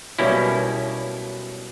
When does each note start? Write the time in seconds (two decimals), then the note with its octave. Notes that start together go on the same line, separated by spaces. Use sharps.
0.19 B1 B2 G3 A#3 C#4 E4